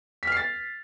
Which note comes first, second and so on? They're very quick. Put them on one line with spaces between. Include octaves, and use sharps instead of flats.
B6 F6 C7 A6